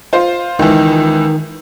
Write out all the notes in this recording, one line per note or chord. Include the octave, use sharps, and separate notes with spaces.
F4 C5
C#2 D#3 E3